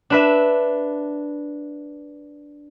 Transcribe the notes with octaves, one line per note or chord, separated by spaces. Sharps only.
D4 B4 E5